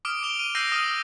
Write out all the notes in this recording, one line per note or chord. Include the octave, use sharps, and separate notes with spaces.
D6 D#6 F6 D7
D7 F7 G7
D#7
E6 G6 A#6 C7 D7 D#7
D#6 F6 D#7